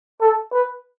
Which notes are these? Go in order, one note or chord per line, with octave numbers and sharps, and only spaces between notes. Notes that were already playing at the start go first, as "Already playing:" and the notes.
A4
B4